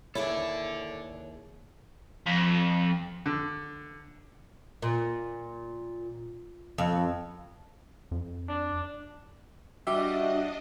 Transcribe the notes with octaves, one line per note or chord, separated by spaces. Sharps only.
D#2 E4 G#4 A4 C#5 D5 E5
F2
D3
A#2
F2
F2
D4
G3 D4 F#4 G4 D#5 E5